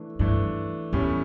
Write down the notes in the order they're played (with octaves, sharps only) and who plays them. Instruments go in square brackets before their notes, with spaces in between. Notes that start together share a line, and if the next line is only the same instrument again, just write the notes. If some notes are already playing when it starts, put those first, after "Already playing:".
Already playing: [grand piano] E3 A3 D4
[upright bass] G2 [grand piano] E3 A3 D4
[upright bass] E2 [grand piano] A2 G3 C#4